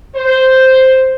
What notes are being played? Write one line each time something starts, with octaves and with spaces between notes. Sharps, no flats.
C5